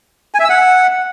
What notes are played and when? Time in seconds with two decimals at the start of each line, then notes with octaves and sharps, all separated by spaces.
0.34 G#5
0.39 E5
0.45 E6
0.50 F#5